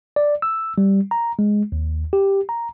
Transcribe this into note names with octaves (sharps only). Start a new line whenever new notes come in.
D5
E6
G3
A#5
G#3
D#2
G4
A#5